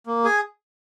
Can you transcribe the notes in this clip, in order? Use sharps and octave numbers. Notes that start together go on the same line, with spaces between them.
A#3
G#4 G#5